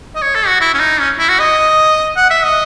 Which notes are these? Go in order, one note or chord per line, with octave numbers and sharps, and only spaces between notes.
D#5
C#5
A4
F#4
E4
C#4
D#4
C#4
E4
F#4
D#5
F#5
E5
D#5